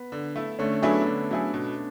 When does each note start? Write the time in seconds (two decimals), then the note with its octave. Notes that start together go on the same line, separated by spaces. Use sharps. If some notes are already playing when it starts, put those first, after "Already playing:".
Already playing: B3
0.12 D3
0.36 A3 E4
0.59 D3 A3 C#4
0.82 F#3 A3 B3 D4 E4 G#4
1.06 D3
1.31 F#3 A3 E4 G#4
1.54 B2